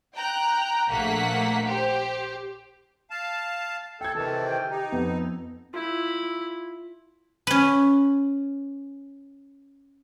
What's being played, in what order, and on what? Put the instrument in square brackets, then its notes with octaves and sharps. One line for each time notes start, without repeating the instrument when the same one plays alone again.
[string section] G5 A#5 F#6
A#1 A3 A#3 F#5 B6
G4 C5
[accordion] F5 A5
[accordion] A4 [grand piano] G5 G#6
[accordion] C3 D#3 E3 [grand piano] A4 [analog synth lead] A5
[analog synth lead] G5
[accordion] D#4 [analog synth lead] G4
[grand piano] F2 [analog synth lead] B3
[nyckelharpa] E4 B5 [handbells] F4
[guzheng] C#4 B4